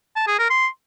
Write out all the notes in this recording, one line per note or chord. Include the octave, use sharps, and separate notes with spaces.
A5
G#4
A#4
C6